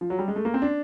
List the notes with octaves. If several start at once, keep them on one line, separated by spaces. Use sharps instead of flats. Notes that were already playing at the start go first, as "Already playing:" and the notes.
F3
F#3
G3
G#3
A3
A#3
C4
D4